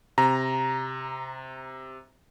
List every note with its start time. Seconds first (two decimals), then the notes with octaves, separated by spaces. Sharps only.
0.18 C3 A#5